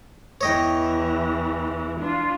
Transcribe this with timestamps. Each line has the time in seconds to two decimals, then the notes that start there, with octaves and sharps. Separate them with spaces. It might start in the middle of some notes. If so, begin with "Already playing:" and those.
0.41 E2 E3 C#5 D#5 G5
1.99 D4 F4